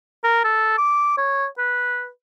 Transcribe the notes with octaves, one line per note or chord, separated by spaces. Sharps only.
A#4
A4
D6
C#5
B4